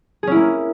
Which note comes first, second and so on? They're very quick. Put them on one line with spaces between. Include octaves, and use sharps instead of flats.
G#4 C#4 E4 A#3